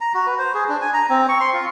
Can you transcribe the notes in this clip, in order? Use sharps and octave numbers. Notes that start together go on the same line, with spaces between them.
A#5
F#4
B4
C5
G#4
D4
G#5
A#5
C4
C#6
C6
F4